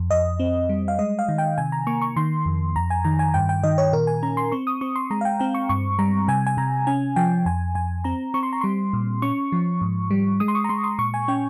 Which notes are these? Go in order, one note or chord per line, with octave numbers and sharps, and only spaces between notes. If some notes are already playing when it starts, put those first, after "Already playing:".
Already playing: F2
F2 D#5
C4
G3
F5
G#3 D#5
F5
D#3
G5
C3 G#5
A#5
A#3 C#6
C#6
D#3 C6
F2
F2 A#5
G#5
D#3 A#5
G#5
G2 G5
G5
D#3 D#5
C#5
A#2 A#4
G#5
C#4 A#5
C6
C4 C#6
D#6
C4 C#6
C6
G#3 A#5
F5
G5
C4 G5
C#6
G2 C#6
G3 A#5
C3 G#5
G#5
C3 A#5
C#4 G#5
F3 G5
F2 G#5
F2 G#5
C4 A#5
C4 C#6
C6
A#5
G3 C6
A#2
C#4 C#6
F3
G#2
G3
G#3 D#6
C6
C#6
A#5
G#3 C6
C6
A#2 C#6
G#5
C#4 G5